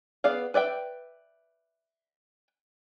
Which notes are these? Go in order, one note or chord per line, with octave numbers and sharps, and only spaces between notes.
B3 G#4 D5 F5
B4 D5 E5 G5